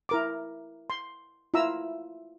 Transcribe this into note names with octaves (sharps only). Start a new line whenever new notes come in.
E4 A#4 D6
C6
E4 F4 E5 A#5 E6